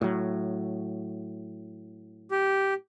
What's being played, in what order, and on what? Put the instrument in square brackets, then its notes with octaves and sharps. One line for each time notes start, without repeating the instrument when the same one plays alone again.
[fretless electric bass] A2 F#3
[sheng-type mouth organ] G4